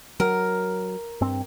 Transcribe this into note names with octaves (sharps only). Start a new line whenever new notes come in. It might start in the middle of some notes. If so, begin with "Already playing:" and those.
F#3 A#4
G2 C4